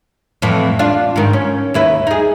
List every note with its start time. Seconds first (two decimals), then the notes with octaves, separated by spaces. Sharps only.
0.42 F2 A2 E3
0.79 D4 F4
1.16 G#2 D#3
1.33 C#4
1.74 D#2 E4 B4
2.07 D#4 G#4